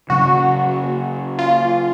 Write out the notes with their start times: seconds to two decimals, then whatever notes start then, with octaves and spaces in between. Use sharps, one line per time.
0.10 C#3 F#3 C#4 F#4
1.39 F4